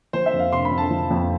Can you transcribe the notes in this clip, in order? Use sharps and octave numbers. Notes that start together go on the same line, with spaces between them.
F3 C5
E5
F2
F5
C3 C6
B5
F2
A5
F3
F2